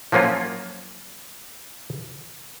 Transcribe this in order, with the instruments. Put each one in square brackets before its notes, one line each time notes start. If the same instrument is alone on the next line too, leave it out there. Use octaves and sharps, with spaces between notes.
[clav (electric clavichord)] F3 F#3 A#3 C#4 F4